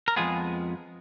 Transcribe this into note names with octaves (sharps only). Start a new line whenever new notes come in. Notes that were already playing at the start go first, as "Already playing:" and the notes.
A#4
F2 F3 G#3 B3 F4 G#4